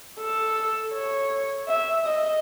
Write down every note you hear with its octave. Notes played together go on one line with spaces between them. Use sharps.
A4
C#5
E5
D#5